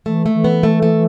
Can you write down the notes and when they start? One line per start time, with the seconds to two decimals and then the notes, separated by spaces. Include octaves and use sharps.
0.06 E3 A3
0.26 A3
0.34 E3
0.44 B3
0.63 A3
0.82 A3